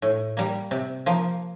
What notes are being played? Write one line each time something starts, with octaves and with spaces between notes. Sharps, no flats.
A2
G3 A#3
C3
F3 A#3